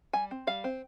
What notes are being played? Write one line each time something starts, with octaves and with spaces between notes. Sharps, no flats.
G3 G#5
C4
G3 F5
C4